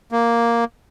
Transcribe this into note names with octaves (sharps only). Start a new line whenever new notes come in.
A#3